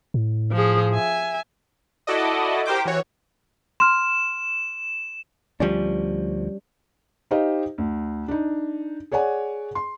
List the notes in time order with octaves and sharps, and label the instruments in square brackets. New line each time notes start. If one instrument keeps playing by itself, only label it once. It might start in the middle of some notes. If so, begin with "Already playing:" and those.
[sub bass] A2
[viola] F3 G#4
E5 G#5
[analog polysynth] E4 F#4 A4 D5 D#5
G4 A#4 C5 G5 D6
E3 F#4 C#5
[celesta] C6 F6 [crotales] E7
[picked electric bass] D2 F3 [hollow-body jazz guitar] G3 C#4 D4
[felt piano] D#4 G4 C5 D#5 F5
D2
D4 D#4
G#4 C#5 D5 F#5 G#5
C6